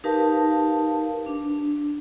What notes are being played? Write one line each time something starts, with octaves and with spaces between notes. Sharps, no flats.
D#4 G4 A#4 B4 F5 A5
D4